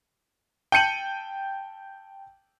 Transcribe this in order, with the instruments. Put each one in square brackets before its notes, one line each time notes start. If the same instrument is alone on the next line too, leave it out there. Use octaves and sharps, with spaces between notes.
[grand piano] G5 A5 G6 C#7 D#7 F#7